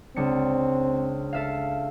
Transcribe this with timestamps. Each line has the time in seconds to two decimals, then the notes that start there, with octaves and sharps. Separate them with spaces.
0.16 C#2 C4 D4 C#7
1.33 A4 E5 F5